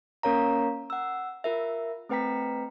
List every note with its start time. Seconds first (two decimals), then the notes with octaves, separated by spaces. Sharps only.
0.23 A#3 C#4 A#4 C#5 F5 A#5
0.90 F#5 E6
1.44 F4 A#4 E5
2.09 A3 C4 B4 G5 A#5 B6